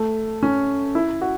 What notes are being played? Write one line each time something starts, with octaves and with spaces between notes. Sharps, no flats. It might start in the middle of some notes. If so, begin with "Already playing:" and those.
Already playing: A3
C#4
E4
F#4